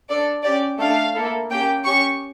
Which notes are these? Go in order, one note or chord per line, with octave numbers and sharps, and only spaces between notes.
D4 A4 D5
C#4 G4 D5
A3 D4 A4 F5
A#3 E4 A4
A#3 C#4 G4 G5
C#4 G4 C#6